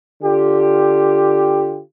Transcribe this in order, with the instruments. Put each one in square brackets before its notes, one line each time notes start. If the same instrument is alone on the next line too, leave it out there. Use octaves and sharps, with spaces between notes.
[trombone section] D3 F4 G4